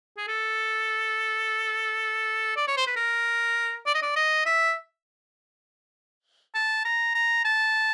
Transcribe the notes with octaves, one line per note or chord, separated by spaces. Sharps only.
G#4
A4
D5
C#5
C5
B4
A#4
D5
D#5
D5
D#5
E5
A5
A#5
A#5
A5